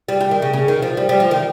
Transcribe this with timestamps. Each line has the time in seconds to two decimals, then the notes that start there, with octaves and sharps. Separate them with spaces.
0.08 G3
0.20 G3
0.31 D#3
0.42 C#3
0.53 C#3
0.68 D#3
0.82 F3
0.97 G3
1.09 G3
1.20 F3
1.31 D#3